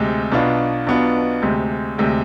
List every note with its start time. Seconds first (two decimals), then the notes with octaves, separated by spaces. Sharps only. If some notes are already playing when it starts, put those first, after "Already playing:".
Already playing: D2 C3 G#3
0.32 B1 B2 B3 D4 F4
0.87 B1 B2 B3 D4 F4
1.42 D2 C3 G#3
1.98 D2 C3 G#3